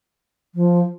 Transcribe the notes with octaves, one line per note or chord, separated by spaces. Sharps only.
F3